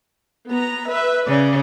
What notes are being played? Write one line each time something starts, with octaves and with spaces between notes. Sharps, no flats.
B3 A#5
B4 E5
C#3 D5